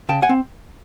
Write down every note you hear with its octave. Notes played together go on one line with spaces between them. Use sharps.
C#3 G5 A5
F#5 G#5
C4